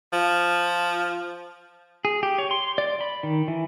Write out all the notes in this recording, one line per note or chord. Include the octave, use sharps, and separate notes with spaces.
F3
G#4
G4
C#5
C6
D5
B5
D#3
E3